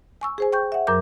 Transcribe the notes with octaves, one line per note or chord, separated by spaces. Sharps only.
G#5 C#6 E6
G#4 C5 G#5
G5 C#6 G6
E5 F#5
F#2 F#3 A#4 D6 G6